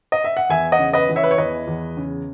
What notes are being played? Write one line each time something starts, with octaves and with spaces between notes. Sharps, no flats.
D#5
E5
F#5
E2 E5 G#5
D#5 F#5
C#3
B4 D#5
E3
C#5 E5
B4
C#5
E2 B4 D#5
E2
C#3